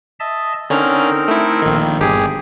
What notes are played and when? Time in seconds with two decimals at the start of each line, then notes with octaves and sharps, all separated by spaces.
0.20 D#5 E5 A5
0.70 D3 C4 C#4 D#4 A#4 F6
1.28 A3 E4
1.62 A#1 D#3
2.00 G1 G4 G#4